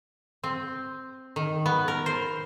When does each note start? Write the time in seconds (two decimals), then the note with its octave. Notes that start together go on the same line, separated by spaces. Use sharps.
0.44 C4
1.36 D#3
1.66 B3
1.88 A#4
2.06 C5